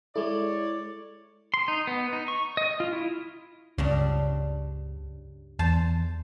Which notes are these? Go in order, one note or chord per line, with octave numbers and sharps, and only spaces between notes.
G#3 E4 A4 C#5 D5
C6
D#4
B3
D#4
C#6
D#5
F4
E4
C#2 G2 C#3 D4
E2 C5 A5